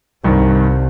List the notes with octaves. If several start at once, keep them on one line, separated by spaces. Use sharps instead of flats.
C2 G2 D#3